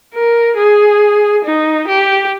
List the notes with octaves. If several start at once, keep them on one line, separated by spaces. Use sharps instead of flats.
A#4
G#4
D#4
G4